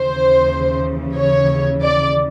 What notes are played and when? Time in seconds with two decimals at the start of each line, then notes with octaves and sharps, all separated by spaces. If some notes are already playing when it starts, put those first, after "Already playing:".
Already playing: D#2 C#3 E3 C5
1.17 C#5
1.83 D5